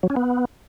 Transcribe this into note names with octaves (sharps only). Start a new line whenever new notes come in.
F#3
C#4
B3